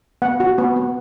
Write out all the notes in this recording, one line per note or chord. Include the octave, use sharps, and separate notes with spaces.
B3 F#5
F#4
B3
B3